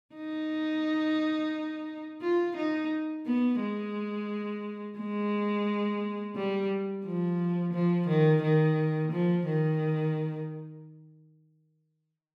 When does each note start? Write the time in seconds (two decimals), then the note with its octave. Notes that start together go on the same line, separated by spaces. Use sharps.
0.15 D#4
2.22 F4
2.57 D#4
3.26 B3
3.60 G#3
4.98 G#3
6.35 G3
7.05 F3
7.73 F3
8.08 D#3
8.42 D#3
9.12 F3
9.46 D#3